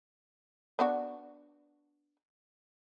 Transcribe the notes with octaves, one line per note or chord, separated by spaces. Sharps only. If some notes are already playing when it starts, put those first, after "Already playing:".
B3 D4 F#4